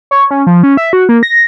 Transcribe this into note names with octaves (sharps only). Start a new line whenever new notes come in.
C#5
C#4
F3
C#4
E5
F#4
A#3
A#6